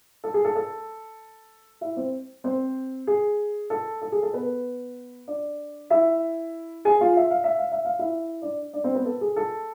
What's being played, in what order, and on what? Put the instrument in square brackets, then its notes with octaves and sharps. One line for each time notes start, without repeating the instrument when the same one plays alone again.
[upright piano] A4
G#4
A4
A4
E4 E5
C4 C5
C4 C5
G#4
A4
A4
G#4
A4
B3 B4
D4 D5
E4 E5
G#4 G#5
F4 F5
E5
F5
E5
F5
E5
F5
E4 E5
D4 D5
D4 D5
C4 C5
B3 B4
A4
G#4
A4